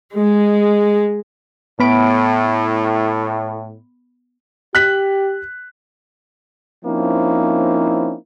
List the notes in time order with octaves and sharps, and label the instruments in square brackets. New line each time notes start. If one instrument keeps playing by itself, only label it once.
[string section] G#3
[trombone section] A2 [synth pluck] B3 B5 D7
[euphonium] G4 [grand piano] F#6 B6 F#7
[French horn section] F3 A#3 C4 C#4 D#4 E4